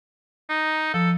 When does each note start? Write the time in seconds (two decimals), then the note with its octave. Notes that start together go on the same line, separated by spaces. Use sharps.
0.49 D#4
0.94 F3 A4